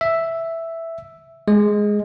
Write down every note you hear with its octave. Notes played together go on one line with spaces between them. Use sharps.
E5
G#3